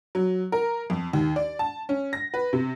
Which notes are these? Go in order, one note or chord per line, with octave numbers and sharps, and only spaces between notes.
F#3
A#4
F2
D#2
D5
A5
C#4
A#6
B4
C3